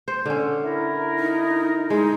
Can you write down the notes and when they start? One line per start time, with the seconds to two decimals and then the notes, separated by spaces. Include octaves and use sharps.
0.08 C5
0.26 D3 C#4
0.63 E4 A#4
1.19 D#4
1.90 G#3 D#4